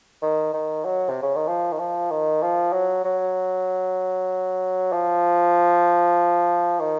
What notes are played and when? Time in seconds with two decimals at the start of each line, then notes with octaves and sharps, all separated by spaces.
0.22 D#3
0.54 D#3
0.85 F#3
1.09 C3
1.22 C#3
1.36 D#3
1.48 F3
1.72 D#3
1.79 F3
2.11 D#3
2.42 F3
2.73 F#3
3.04 F#3
4.92 F3
6.80 D#3